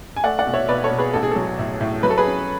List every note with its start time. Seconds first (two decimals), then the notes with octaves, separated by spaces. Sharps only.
0.16 G#5
0.24 A3 D5 F#5
0.39 D5 F#5
0.46 B1
0.54 C#5 E5
0.68 B1 B4 D5
0.84 A4 C#5
0.91 B2
0.98 G#4 B4
1.13 A1 A4
1.23 G#4
1.31 F#3 A4
1.59 A2
1.81 A2
2.03 F#3 B4
2.10 A4
2.18 G#4 B4
2.26 C#4